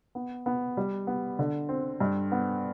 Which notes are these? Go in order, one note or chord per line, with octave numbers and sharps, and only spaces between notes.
B3
B3
G3
B3
D3
C4
G2
B3